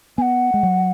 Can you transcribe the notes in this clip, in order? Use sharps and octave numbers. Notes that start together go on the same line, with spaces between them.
B3 F#5 G#5
G#3
F#3